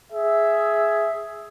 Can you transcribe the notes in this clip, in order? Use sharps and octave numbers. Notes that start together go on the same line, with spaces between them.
G#4 E5